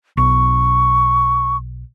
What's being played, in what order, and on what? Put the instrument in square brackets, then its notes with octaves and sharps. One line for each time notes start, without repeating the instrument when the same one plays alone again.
[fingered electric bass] B1 [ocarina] C#6